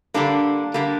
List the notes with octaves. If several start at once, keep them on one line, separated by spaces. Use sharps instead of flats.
D3 G3 A#3 D4
D3 G3 A#3